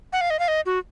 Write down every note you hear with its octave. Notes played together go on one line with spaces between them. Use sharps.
F#5
F5
D#5
F5
D#5
F#4